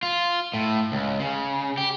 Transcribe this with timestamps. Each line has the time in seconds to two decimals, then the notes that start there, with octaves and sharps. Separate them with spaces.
0.03 F4
0.54 A2
0.92 C#2
1.20 C#3
1.78 G4